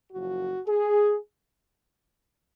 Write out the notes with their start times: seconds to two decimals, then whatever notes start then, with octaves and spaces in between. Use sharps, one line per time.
0.12 F#1 F#2 F3 F#4
0.67 G#4